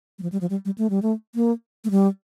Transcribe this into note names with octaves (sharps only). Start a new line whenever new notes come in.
G3
F3
G3
F3
G3
G3
A3
G3
A3
A#3
A3
G3